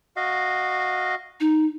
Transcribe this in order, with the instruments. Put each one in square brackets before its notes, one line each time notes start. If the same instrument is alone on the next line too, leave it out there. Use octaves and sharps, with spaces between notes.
[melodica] F#4 D#5 F5
[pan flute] D#4